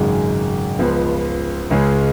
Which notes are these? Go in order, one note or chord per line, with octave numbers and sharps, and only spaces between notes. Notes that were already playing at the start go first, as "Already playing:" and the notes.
Already playing: G#1 F#2 C#3 G#3
C#2 C#3 F3 B3
C#2 C#3 G#3 C#4